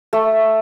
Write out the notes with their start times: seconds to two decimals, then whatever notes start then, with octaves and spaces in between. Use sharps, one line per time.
0.13 A3